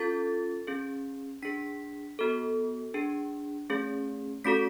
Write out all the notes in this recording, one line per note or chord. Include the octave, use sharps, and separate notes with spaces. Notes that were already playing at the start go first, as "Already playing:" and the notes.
Already playing: C#4 F4 A4 A6
C#4 G#4
D4 G#4 B6
B3 F#4 A4
D4 G#4
A3 C#4 G#4
A3 C#4 F#4 A4 B6